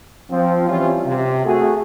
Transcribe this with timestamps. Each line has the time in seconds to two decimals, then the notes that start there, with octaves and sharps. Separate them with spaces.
0.31 F3 C4
0.68 E3 G3 C#4 F4
1.05 C3
1.45 A3 F#4 G#4